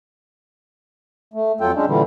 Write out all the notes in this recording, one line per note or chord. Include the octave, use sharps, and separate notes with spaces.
A3
F2 F#3 F4 A4 G5
G#3 C#4 D4
A#2 D3 E3 G3